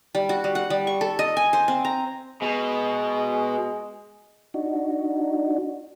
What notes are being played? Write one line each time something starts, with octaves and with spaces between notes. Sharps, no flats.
G3
F#4
G3
F#5
G3
C#6
A4
D#5
G#5
C5
C4
A#5
B2 G#3
D4 D#4 F#4